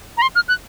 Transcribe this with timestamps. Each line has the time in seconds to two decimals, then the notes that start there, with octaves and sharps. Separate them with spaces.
0.18 A#5
0.22 C6
0.35 F6
0.48 F#6